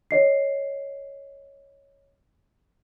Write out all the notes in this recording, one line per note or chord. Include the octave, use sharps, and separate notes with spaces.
C#5 D#5 C7